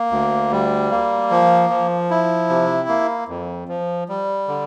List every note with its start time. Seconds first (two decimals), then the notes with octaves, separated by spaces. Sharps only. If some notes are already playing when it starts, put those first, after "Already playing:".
Already playing: A#3
0.11 D2
0.51 G3
0.91 A#3
1.31 F3
1.70 F3
2.10 E4
2.49 C3
2.89 A#3
3.28 F2
3.68 F3
4.09 G3
4.48 D3